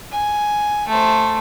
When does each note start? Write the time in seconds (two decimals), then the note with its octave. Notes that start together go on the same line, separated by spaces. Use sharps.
0.12 G#5
0.88 A3 C5